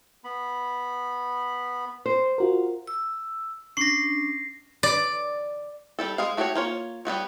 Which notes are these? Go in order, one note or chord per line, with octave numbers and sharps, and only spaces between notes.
B3 B5
C5
F4 F#4 A#4
E6
C#4 D4 A#6 C7
D5
G3 G4 A4
G#3 G#4 F5
A3 F#4 G4 C5 C#5
A#3 F4 C#5
G3 B3 F#4 C#5